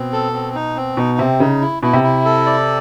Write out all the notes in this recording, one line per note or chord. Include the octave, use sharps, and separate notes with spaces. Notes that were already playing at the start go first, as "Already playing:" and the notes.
Already playing: B2 C4
A4
C4
D#4
C4
B2 D#4
C3 C4
C#3 D#4
E4
B2 E4
C3
E4
A4
D5